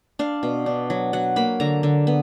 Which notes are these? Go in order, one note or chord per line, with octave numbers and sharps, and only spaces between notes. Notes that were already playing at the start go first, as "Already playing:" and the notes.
D4 F5
B2
D4
F#3
F#3 F#5
A#3 B5
D3 A#5
D3
B3